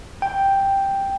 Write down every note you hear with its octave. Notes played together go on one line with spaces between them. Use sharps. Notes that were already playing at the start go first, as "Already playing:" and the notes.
G5